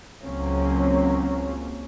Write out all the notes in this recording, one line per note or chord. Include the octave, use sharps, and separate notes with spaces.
C#2 F#3 A#3 C4 C#4